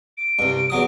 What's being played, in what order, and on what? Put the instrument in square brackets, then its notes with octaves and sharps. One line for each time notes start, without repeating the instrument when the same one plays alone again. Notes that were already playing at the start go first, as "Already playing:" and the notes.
[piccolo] D7
[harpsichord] C2 G2
E2 F#3 D#6